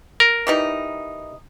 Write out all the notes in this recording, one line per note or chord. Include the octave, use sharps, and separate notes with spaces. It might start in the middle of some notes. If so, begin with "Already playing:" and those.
A#4
E3 G3 D#4